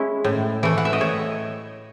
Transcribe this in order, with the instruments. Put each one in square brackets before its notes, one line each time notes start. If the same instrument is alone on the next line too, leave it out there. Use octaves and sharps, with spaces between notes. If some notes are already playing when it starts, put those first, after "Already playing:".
Already playing: [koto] G#3 C#4 E4
A2
E3 A3
F#5
E5
D#5
A2 C#5